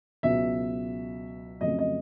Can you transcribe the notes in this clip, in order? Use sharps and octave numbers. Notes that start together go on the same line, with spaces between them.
C#2 B2 F#3 B3 E5
F2 C#3 F#3 A3 D#5
D#5